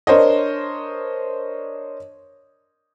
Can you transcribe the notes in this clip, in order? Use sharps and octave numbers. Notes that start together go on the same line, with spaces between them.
D4 A#4 C5 C#5 D#5